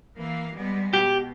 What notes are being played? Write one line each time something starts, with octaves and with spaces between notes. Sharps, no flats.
E3 A#3 F5
G3 G#3 B3
B2 G4